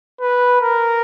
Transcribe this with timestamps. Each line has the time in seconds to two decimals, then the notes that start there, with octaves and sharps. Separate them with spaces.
0.21 B4
0.61 A#4